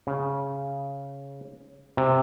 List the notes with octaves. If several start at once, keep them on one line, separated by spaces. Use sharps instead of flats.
C#3
C3